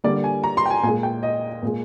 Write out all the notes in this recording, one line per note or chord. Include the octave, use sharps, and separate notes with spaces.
D3 G3 A#3 D5
G#5
A#5
C6
G5
G#5
A#2 G#3 G#5
G5
D#5
A#2 G#3